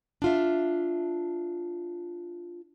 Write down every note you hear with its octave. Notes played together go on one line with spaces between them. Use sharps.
D4 F4 E5